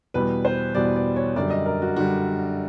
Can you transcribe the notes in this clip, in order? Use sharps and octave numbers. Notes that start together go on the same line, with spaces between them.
E2 B2 G3 B4
C5
E2 B2 G3 D5
D5
C#5
F#2 D3 G3 D5
D#5
A#4
F#4
D3 G3 F#4